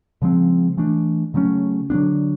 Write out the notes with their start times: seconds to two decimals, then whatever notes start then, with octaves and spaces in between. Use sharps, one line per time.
0.22 C#3 F3 G#3 C4
0.77 E3 A3 D4
1.34 C#3 F#3 A3 C#4
1.90 D3 F#3 B3 D4